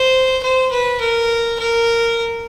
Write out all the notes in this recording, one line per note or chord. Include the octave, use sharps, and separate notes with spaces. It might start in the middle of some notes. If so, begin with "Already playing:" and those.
Already playing: C5
C5
B4
A#4
A#4